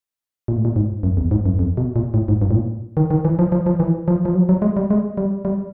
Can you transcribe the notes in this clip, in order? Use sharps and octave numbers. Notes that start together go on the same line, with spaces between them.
A#2
A2
A#2
G#2
F#2
E2
G#2
F#2
F2
B2
A#2
A2
G#2
G2
A2
A#2
D#3
D#3
E3
F3
F3
F3
E3
F3
F3
F#3
F#3
G#3
G3
G#3
G3
G3